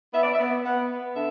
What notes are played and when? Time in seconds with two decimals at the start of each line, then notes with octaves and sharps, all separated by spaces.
0.12 B3 E5
0.22 D5
0.32 E5
0.37 B3
0.63 B3 F#5
0.89 B3
1.14 D3 E5